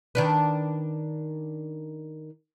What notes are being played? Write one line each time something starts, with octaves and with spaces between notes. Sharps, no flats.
D#3 D4 B4